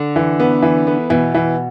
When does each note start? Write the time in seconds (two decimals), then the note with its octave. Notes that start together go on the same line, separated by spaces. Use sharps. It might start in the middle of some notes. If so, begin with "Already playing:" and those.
Already playing: D3
0.16 E3
0.40 B3
0.62 E3
0.87 B3
1.10 B2 E3
1.34 E3